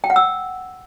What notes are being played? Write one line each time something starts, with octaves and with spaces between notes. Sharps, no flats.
G5
F#5
E6